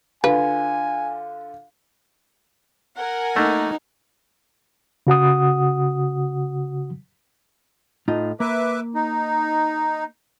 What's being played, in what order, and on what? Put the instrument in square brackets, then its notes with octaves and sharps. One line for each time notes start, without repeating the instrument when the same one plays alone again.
[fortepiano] D3 F4 [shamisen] B4 [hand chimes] F5 [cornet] G#5
[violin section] A#4 F#5 G#5
[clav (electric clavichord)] A3 A#3 [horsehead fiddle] D#4
[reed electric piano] C#3 F#4 F#5 D#6
[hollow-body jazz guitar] A2 D#4 F4
[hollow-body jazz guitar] A#3 [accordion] B4 E5 D6
[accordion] D#4